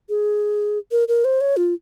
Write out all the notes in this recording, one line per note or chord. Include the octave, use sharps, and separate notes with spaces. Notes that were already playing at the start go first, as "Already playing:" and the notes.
G#4
A#4
A#4
C5
C#5
F4